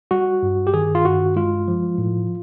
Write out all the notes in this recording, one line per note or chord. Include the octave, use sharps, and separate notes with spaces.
G3 F#4
G2
G4
D#3 G#4
F4
G2 F#4
G#3 F4
F3
A2